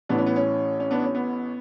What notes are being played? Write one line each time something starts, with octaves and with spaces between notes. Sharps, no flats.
A1 A2 E3 B3 D4
C#4
B3
C#4
C#4
B3 D4
C#4
B3